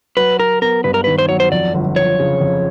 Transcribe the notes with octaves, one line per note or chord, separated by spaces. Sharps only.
F#3 B4
F#3 A#4
B3 A#4
G2 B4
A#4
D#3 B4
C5
F#3 C#5
C5
F2 D5
G1
F3 C#5
C#3
F2